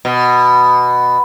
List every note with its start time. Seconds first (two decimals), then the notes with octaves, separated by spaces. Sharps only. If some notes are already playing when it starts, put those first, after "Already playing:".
0.05 B2